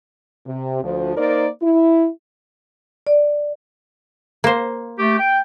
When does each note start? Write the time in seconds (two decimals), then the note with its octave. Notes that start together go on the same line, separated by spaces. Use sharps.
0.47 C3
0.83 D2 F3
1.17 A#3 D#4 A#4 C5 D5
1.62 E4
3.07 D5
4.44 A#3 C5
4.99 A3 G4
5.19 G5